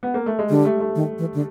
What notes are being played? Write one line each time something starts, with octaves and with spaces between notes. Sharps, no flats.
B3
A#3
A3
G#3
D3 G3
A3
A3
D#3
E3
D3